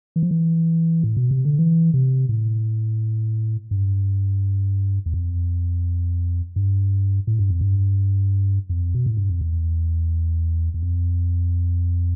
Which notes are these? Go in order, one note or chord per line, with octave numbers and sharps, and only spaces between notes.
E3
F3
E3
A2
B2
C3
D3
E3
C3
A2
G2
E2
F2
G2
A2
G2
F2
G2
F2
B2
A2
G2
F2
E2
E2
F2